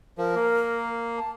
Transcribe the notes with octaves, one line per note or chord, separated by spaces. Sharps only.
F3 A#4
A#3
A5